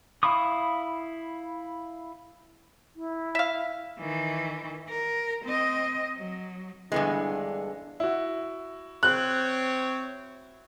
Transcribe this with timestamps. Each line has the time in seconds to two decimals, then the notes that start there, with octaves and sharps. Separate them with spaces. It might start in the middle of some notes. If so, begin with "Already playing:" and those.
0.23 E4 F5 B5 C#6 D#6
2.96 E4
3.35 E5 F5
4.00 D#3 E3
4.89 A#4
5.45 C4 D#5
6.16 F#3
6.92 G2 D3 E3 G#3 B3 D4
8.00 E4 F#4
9.03 C4 C#5 F#6